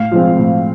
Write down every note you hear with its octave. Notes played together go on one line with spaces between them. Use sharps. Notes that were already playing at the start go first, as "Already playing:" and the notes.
Already playing: A2 F5
F3 G#3 C4
A2